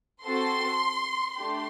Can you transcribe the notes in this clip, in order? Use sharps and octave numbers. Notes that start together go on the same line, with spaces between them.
C4 F#4 A4 C6
A3 D4 G4 C6